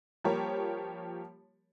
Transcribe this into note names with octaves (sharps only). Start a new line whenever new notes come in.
F3 G3 A#3 G4 A#4 C#5